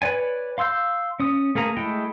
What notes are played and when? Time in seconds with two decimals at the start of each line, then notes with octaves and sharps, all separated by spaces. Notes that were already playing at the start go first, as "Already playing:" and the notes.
0.02 B4 C#5 D5 G#5
0.58 F5 C6 E6 G6
1.20 C#4 D#6
1.55 A3 A#3 G#4 A#5
1.77 G#3 A3 E4 G5